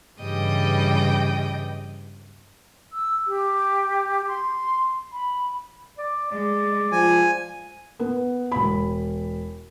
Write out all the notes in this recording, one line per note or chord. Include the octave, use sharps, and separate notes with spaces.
G2 C#3 E3 G3 D#5 G5
E6
G4
C6
B5
D5
G#3 D5
F3 G#5
B3
E1 B5